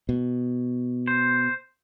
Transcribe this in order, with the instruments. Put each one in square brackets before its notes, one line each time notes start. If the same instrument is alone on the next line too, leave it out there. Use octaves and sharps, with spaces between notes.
[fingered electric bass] B2
[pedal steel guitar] C5